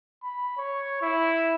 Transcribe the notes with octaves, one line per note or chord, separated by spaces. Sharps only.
B5
C#5
E4